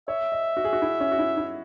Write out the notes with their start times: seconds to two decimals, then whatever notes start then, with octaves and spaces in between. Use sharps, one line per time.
0.08 C#5 E5
0.32 D#5
0.57 F#4
0.65 G#4
0.73 F#4
0.82 E4
1.00 C#4
1.12 F#4
1.19 E4
1.37 E4